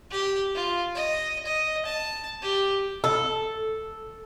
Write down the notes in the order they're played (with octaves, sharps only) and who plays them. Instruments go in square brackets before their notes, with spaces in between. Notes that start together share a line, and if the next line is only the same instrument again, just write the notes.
[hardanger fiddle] G4
F4
D#5
D#5
A5
G4
[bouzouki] A4